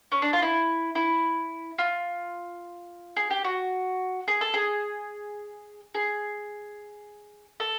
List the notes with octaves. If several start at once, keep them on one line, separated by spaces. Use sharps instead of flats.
C#4
D4
F4
E4
E4
F4
G#4
G4
F#4
G#4
A4
G#4
G#4
A4